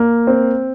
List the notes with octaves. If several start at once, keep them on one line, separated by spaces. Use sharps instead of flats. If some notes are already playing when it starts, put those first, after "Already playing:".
Already playing: A#3
C4